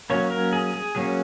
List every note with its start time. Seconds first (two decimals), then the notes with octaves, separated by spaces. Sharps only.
0.10 F#3 A#3 C#4 C#5
0.30 A#4
0.53 G#4
0.73 G#4
0.95 F#3 A#3 C#4 G#4